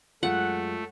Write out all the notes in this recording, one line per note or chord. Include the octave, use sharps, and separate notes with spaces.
F#2 G#3 A3 F4 F#5